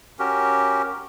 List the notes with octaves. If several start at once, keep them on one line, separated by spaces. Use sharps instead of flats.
C#4 F#4 G4 A#4